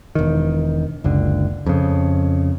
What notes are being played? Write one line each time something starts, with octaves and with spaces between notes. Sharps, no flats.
E1 D#3
F#1 C#2 D3
F2 C#3